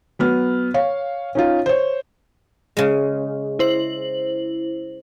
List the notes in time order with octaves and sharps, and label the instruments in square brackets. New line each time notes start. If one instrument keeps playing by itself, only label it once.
[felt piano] F#3 B3 F6
C#5 F5
C#4 D#4 F4
C5 C#5
[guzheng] C#3 G#3
[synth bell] E4 C5 F#7